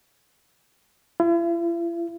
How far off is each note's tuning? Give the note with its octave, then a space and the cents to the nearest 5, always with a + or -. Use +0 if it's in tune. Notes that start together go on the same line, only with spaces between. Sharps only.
E4 +45